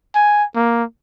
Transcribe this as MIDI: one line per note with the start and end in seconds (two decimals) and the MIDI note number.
0.15 0.44 80
0.55 0.84 58